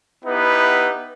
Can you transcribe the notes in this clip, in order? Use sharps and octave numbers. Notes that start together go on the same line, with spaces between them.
B3 D#4 E4 G4 B4